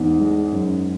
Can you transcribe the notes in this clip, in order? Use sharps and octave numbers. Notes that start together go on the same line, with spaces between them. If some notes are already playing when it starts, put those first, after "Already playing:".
Already playing: E2 G#2
G#3
F#2